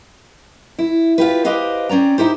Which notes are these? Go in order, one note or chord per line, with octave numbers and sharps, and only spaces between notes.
E4
F4 G4 B4
G4 B4 C5 D#5 F5
C4 C#4 D5 A#5
D#4 E4 G4 C5